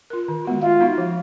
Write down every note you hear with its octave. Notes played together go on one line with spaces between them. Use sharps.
F4 A#4
D#3
G#3 B3 F#4
G#3 F4
B3 D#4 F#4
F3